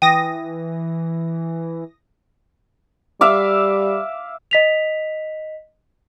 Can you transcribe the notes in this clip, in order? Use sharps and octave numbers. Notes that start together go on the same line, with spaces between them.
E3 G5 D#6 A#6
G3 E5 F5 D6
D#5 B6 F7